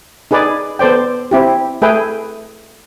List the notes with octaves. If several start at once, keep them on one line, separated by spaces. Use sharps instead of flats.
D#4 G#4 B4 D5
B3 A4 C5 D5 G5
C4 E4 G4
A3 G#4 B4 E5 G5